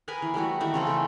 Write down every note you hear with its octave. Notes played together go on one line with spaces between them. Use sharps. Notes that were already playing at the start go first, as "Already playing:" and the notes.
G#4 A#4 B4 G#5
E3
G3 A3 E4 F#4
D#3 E3 A3 D#4
C#3 C4 A4
A3 G5